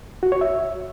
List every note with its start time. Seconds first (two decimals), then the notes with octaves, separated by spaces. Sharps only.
0.23 F#4
0.32 C#5
0.41 E5